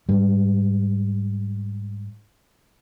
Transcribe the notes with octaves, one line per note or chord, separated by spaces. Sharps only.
G#2 G3